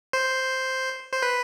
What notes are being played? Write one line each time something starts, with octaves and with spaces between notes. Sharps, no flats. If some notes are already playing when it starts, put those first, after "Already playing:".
C5
C5
B4